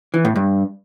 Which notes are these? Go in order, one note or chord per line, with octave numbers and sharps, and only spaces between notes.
E3
A2
G2